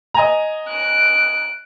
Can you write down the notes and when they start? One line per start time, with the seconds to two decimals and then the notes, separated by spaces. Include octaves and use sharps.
0.14 D#5 G#5 A#5
0.68 F#6 D7